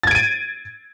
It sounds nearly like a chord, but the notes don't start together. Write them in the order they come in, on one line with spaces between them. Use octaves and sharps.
A6 G#6 D7 D#7